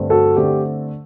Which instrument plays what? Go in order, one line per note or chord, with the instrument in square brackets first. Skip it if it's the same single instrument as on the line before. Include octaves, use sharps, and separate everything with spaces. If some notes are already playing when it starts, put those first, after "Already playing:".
Already playing: [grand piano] G2 D3 A3 C4
[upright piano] F#4 A4
[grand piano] D3 A3 C4 [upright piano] G4